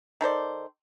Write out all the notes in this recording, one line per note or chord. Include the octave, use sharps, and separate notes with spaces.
D#3 A4 C5 D5